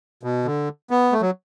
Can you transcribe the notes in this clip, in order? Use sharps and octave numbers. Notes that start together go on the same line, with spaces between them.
B2
D3
B3
A3
F#3